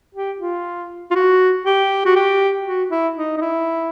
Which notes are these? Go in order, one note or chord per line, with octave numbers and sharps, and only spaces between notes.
G4
F4
F4
F#4
G4
F#4
G4
F#4
E4
D#4
D#4
E4